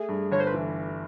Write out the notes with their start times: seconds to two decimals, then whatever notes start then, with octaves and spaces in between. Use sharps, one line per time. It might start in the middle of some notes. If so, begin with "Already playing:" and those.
Already playing: A3 G#4
0.09 G2
0.32 G1 C#5
0.40 C5
0.46 B4
0.54 E3